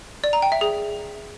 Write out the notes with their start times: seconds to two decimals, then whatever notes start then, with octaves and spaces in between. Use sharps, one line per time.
0.24 D5
0.33 A#5
0.42 G5
0.52 E5
0.61 G#4